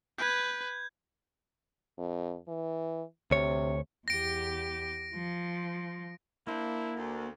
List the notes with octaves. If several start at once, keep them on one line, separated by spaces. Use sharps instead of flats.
B4 G6 G#6
F2
E3
D2 C3 C#5
E2 G4 A#6 D7
F3
A#3 D4 E4 C5
D2